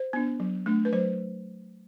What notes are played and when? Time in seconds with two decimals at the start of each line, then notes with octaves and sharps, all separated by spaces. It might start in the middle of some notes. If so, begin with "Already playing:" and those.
Already playing: C5
0.13 B3 D4
0.40 F#3
0.66 A3 D4
0.85 B4
0.92 F#3 C5